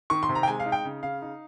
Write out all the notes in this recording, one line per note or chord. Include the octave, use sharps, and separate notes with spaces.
D#3 C#6
C6
C3
A#5
G5
G#3 G#5
F5
D#4
G5
C#3
C#3 F5
D#4